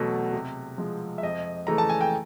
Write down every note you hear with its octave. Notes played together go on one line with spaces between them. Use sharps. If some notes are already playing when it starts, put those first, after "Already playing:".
Already playing: E2 B2 F#3 A3
C3
F3 G#3
E5
F2 D#5
C#3 E3 A3 A#5
A5
G#5
G5